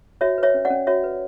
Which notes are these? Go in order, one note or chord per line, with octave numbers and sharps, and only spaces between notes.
F#4 C#5 E5
B4
C#5 E5
C#4
D5 F#5
C#4
F#4 C#5 E5
B4